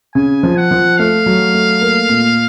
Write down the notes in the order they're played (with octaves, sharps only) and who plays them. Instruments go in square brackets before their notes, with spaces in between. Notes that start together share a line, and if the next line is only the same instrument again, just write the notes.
[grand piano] C#3 [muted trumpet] G#5
[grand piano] F3
[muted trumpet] F#5
[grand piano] F3
[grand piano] A3 [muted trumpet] F5
[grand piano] F#3
A3
A#3
A#2